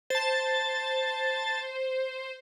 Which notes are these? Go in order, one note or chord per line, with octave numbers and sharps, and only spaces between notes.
C5 A5 A6